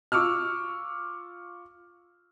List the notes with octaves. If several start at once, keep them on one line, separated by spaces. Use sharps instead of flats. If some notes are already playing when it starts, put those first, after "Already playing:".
F4 C#6 D6 E6 F6